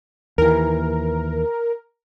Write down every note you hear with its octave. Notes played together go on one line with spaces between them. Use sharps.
D#2 E3 A#4